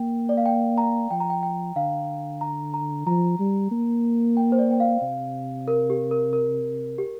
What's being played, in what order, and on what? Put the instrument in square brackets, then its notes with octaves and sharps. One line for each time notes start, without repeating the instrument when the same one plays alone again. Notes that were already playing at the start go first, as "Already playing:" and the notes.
Already playing: [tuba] A#3 [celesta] G5
[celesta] D5
F5
G5
A#5
[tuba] F3 [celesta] G5
[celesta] A#5
G5
G5
[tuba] D3 [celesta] F5
[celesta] A#5
A#5
[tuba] F3 [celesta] A#5
[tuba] G3
A#3
[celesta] G5
C5
D5
G5
F5
[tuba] C3
[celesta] A#4
G4
A#4
A#4
G4